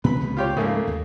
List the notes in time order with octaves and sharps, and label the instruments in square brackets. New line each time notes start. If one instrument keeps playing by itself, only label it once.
[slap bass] B2 B3 C4 [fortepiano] B4 B5
[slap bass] C#2 C3 D#3
[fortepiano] F4 G4 C#5
[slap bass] G#2 F3 [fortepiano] C#3 A3 A#3
[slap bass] D#2